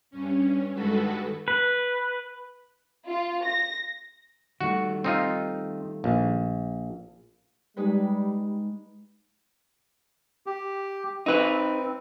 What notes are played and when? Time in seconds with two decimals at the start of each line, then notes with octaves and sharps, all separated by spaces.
0.11 G2 C#4
0.74 G2 D#3 G#3 F#4 A4 B4
1.48 B4
3.06 F4
3.45 A#6
4.61 D#3 G3 A3 F#4
5.04 C4 D#4 F4
6.04 A#1
7.77 G3 G#3 D#4 B4
10.46 G4
11.26 C4 D#4 B4